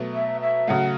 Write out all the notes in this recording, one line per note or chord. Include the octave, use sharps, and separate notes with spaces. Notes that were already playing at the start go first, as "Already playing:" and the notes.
Already playing: B2 F#3 A3
E5
E5
C#3 F#3 A3 F#5